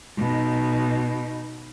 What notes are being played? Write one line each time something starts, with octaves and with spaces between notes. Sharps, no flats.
B2 D#4